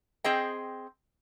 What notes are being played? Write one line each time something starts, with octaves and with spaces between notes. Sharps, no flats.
C4 G#4 D#5 G5